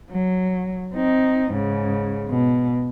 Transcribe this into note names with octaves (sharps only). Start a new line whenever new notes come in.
F#3
C4 D#4
G#2 C#3
B2